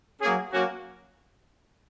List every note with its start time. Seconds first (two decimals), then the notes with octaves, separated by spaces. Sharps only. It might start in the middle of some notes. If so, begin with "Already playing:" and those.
0.21 F#3 A#3 C#4 G#4
0.52 F#3 A#3 C#4 F#4